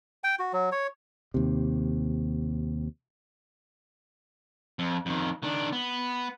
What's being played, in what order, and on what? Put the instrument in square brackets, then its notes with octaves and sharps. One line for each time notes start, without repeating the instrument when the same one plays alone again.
[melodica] G5
F#4
F#3
C#5
[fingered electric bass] D#2 C3
[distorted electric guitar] F2
F2 D#3
D#3 D4
B3